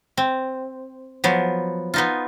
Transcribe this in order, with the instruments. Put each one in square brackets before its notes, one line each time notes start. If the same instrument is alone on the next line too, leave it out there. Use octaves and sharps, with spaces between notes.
[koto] C4
F3 F#3 B3
B3 D#4 F4